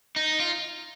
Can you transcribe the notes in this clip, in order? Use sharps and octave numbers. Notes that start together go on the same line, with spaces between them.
D#4
F4